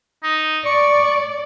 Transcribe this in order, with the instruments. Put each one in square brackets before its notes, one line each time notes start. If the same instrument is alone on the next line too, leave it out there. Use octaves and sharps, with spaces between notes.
[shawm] D#4
[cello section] D5 [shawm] C#6